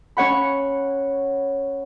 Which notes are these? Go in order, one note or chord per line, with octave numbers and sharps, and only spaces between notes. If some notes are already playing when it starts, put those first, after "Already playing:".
C#4 C#5 F#5 B5